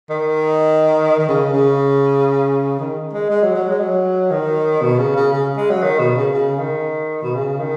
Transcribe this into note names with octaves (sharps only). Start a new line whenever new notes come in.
D#3
D#3
C#3
C#3
D#3
G#3
G#3
F#3
F#3
G#3
F#3
D#3
B2
C#3
C#3
C#3
G#3
F#3
D#3
B2
C#3
C#3
D#3
B2
C#3
D#3